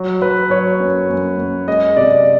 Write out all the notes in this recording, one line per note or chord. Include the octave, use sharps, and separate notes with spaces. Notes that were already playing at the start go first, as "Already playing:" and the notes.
Already playing: F#3
F#3 B4
F#3 C#5
F#2
F#2
F#2
G#3 D#5
C3 D5